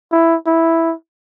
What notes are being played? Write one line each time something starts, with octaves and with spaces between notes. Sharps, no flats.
E4
E4